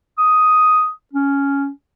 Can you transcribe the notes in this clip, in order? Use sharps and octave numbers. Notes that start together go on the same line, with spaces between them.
D#6
C#4